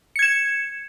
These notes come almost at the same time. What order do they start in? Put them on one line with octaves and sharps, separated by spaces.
C#7 G#6 E7